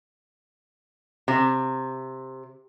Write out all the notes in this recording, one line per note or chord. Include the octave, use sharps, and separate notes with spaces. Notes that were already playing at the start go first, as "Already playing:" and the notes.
C3